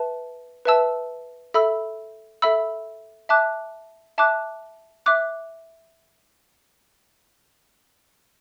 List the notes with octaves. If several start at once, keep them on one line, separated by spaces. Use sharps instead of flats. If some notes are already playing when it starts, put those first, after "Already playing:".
Already playing: B4 E5 A5
B4 E5 A5 E6
A4 E5 B5 E6
A4 E5 B5 E6
E5 A5 D6 F#6
E5 A5 D6 F#6
E5 D6 F#6